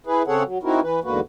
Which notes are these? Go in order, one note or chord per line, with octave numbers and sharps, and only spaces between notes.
E4 G#4 B4
C#3 C4 G#4 A4 C#5 F#5
F#3
C4 D#4 E4 F#4 A#4
E3 B4
E2 G#2 D3 A#3 F#4 B4